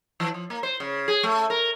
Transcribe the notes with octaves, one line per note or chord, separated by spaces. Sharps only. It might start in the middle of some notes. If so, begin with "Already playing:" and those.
E3
F3
A#3
C5
C#3
G#4
A3
A#4